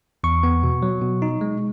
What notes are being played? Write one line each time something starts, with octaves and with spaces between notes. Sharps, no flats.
E2 C#6
B3
B2
F#3
B2
D#4
G#3